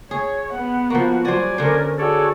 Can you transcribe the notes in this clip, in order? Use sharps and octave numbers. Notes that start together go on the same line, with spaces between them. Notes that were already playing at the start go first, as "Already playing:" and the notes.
G#4 C#5
B3 F#5
F3 A#3 F#4
F#3 G3 F#4 C5 D5 G#5
D3 C#4 A#4 C5
F#4 G#4 A4 C#5 D5